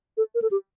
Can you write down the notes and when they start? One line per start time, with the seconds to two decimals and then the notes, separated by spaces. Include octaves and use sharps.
0.17 A4
0.35 A#4
0.42 A4
0.51 G4